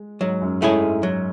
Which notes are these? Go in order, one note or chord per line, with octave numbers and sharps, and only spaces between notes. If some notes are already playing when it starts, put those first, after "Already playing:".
Already playing: G#3
G#2 F#3
F#2
G#2 A3 E4 G#4 C#5
G#2
F#3